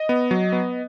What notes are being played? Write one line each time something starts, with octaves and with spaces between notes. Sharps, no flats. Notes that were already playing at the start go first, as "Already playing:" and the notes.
Already playing: D#5
B3
F#3
B3